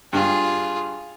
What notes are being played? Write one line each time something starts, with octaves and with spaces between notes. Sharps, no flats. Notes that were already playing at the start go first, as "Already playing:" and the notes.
G2 F4 G#4